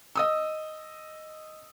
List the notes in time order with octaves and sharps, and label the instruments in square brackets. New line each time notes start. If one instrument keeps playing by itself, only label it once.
[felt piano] D#5 D#6 E6